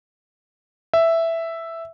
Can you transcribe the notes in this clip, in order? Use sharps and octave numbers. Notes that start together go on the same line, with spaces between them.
E5